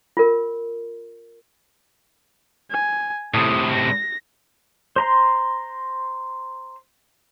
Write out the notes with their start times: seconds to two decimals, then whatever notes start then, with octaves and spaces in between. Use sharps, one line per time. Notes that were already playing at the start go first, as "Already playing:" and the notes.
0.17 F4 A#4
2.71 G#5
3.34 A2 C3 D#6
3.72 A#6
4.96 C5 A#5 C6